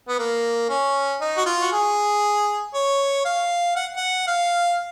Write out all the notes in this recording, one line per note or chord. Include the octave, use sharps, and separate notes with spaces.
B3
A#3
C#4
D#4
F#4
F4
F#4
G#4
C#5
F5
F#5
F#5
F5